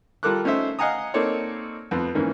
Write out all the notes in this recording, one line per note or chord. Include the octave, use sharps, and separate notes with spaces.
G3 F4 A4 A#4 D6 F#6
A3 C#4 D#4 C5 E5
D#5 F5 F#5 G#5 A#5 D#6
A#3 C4 D#4 A4 C#5 D5
F2 B3 F4
G#2 E3 A#3 C#4